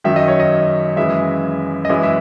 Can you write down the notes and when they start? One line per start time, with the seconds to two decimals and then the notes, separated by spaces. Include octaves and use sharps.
0.04 F#2 D#3 F#3 E5
0.16 D#5
0.28 C#5
0.40 D#5
0.96 F#2 C#3 E3 G#3 E5
1.85 D#5
1.89 F#2 E3 G#3 E5
2.03 E5